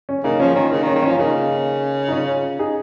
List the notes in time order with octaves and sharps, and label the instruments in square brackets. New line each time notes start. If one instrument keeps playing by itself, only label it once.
[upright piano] C#4
[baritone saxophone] C#3 [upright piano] A#3 D#4
[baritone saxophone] F3 [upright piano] C#4
[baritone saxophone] D#3 [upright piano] C#4
[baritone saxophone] C#3 [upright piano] A#3 D#4
[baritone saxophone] D#3
[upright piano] C#4
[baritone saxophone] D#3
[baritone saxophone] F3 [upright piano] C#4
[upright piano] F4
[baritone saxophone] C#3 [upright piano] A#3 D#4
[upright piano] D#4
C#4 F4
D#4 G#4